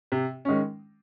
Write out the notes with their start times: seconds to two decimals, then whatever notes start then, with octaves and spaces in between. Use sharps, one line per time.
0.12 C3
0.45 D#3 G#3 C#4